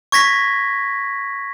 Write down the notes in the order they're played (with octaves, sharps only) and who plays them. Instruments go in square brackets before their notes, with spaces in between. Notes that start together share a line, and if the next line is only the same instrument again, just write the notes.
[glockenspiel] C#6 G#6 A#6 B6